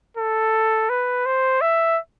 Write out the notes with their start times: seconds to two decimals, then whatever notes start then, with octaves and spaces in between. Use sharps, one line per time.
0.17 A4
0.89 B4
1.26 C5
1.61 E5